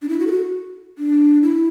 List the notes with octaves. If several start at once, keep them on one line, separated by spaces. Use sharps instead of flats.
D4
E4
F#4
A4
F#4
D4
E4